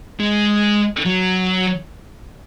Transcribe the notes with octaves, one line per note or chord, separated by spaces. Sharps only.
G#3
F#3